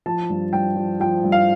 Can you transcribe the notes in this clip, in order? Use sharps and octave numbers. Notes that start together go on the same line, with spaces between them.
F3 A5
G2
G2 G5
F3
F3 G5
G2
F5